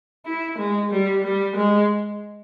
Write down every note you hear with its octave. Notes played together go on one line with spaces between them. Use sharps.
E4
G#3
G3
G3
G#3